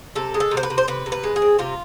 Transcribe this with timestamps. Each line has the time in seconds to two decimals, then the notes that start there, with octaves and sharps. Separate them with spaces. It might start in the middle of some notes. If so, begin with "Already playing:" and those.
0.15 C3 A4
0.34 G#3
0.40 A4
0.51 C3
0.57 C5
0.63 B4
0.70 C3
0.78 C5
0.88 C3 B4
1.06 C3
1.12 B4
1.24 G#3
1.36 G#4
1.42 C4
1.59 C3 F4